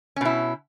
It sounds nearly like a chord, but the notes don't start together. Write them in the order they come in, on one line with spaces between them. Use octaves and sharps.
C#4 B2 E4